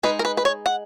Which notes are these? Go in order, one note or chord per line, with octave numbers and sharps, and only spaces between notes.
G#3 D#4 B4
A#4
B4
B4
C#5
F#5